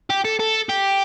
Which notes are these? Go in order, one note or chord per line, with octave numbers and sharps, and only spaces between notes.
G4
A4
A4
G4